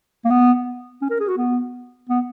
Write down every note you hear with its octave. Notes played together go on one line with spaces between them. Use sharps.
A#3
B3
C#4
A#4
G#4
F#4
B3
B3